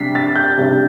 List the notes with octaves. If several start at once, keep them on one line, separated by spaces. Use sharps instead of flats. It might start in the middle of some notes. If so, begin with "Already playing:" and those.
Already playing: C3 G3 D4 B6 C7
A6
G6
C3 G3 D4